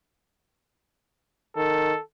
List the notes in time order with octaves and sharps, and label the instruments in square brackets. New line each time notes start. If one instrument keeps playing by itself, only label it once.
[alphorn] D#3 [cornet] A4